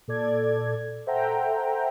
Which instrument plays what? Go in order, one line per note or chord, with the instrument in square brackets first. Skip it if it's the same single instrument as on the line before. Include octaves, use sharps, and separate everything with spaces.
[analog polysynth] A#2 A4 D5 G#6
A4 C5 E5 F#5 G5 A#5